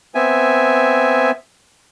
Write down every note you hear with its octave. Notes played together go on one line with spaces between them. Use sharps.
B3 C4 E5 G#5